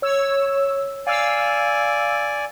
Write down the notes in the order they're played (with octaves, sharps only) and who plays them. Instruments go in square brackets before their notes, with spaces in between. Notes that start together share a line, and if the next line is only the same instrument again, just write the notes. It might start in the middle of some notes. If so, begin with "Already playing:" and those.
[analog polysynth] C#5 E6
[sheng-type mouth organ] D5 G#5 [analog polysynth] F5 E6